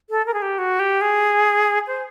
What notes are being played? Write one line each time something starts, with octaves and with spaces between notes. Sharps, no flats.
A4
A#4
G#4
G4
F#4
G4
G#4
C5